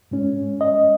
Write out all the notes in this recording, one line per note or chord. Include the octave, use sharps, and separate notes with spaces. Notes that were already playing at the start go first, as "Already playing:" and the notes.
G#2 G#3 C#4
D#5